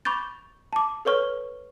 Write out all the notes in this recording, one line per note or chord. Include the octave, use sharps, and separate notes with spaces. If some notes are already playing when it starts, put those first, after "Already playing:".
B5 C#6 D6 G6 A6
A5 D6
A4 B4 C#5 C#6 F6